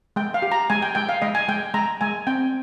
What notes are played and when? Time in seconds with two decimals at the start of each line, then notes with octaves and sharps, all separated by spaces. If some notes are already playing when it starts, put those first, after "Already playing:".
0.16 G#3 G5
0.34 F5
0.42 G4
0.52 A#5
0.70 G#3 G#5
0.82 G5
0.95 G#3 G5
1.09 F5
1.22 G#3 D#5
1.35 G#5
1.48 G#3 G5
1.74 G#3 A#5
2.01 G#3 G#5
2.27 C4 G5